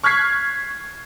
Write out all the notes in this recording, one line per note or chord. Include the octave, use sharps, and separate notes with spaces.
C#6 F6 F#6 G#6 B6 C7